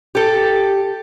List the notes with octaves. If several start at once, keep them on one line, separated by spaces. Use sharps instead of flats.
G4 A4